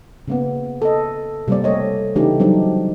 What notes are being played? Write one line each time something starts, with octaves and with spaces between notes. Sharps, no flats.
C#3 A#3 B3
A4 D#5
C3 G3 A#3 C4 D5
A3 A4 A#4 C#5 D#5
C#3 E3 A3 D4 D#4 G4
F#3 G3 C4 D4 D#4